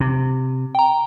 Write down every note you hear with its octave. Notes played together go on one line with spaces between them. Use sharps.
C3
G5 A#5